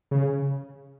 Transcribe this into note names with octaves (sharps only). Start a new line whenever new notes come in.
C#3